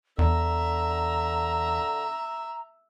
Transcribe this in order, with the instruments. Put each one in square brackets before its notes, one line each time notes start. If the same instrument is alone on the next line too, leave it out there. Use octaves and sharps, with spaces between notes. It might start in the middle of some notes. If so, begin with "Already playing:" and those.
[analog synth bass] E2 [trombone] D3 [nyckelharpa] E5 [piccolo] A#5